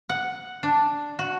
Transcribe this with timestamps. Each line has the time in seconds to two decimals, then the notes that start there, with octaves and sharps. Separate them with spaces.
0.09 F#5
0.63 D4
1.19 F#4